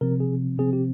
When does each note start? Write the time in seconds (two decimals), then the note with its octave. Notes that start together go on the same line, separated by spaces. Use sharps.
0.01 C3 F3 C4 A#4
0.20 G#4
0.58 C3 F3 C4 G#4
0.73 G4